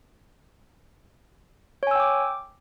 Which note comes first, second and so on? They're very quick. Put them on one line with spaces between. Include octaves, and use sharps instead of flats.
C#5 G#5 E6 G5 D6